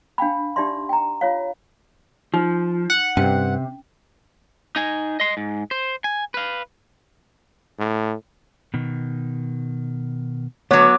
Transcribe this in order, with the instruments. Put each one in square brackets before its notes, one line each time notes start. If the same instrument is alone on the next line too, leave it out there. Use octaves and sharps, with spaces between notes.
[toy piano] D4 F5 G5 B5
D4 D#4 G4 D5 E5 C6
G5 A#5
F4 C#5 F5
[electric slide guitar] F3 [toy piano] D#4
[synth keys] F#5
[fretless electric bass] G2 [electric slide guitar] C3 [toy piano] C#4 G5
[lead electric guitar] D#4 G#5
D#5 C6
G#2
C5
G#5
B4 F5
[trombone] A2
[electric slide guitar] B2 D#3
[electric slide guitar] D3 A3 [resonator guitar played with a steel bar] F#3 B3 [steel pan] C#5 [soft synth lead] D6